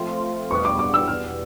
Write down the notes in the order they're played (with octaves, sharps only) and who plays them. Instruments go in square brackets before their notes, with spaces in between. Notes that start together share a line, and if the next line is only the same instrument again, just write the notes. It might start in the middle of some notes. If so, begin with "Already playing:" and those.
Already playing: [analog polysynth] F3 A3 C4 F4
[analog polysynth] E2 B2 G3 B3 [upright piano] C#6
[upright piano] D6
D6
E6
F6